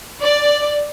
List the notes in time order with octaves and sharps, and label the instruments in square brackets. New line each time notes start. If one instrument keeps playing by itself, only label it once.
[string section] D5